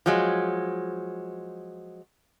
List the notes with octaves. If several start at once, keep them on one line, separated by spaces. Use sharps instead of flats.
F3 F#3 G#3